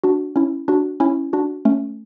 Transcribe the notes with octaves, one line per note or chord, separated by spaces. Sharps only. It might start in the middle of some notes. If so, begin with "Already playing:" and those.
D4 F#4
C#4 E4
D4 F#4
C#4 E4
D4 F#4
A3 C#4